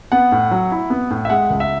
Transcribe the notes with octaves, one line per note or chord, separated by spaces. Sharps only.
B3 F#5
A2
F#3
E4
B3
A2
E5
G#3 F#5
C#2
E5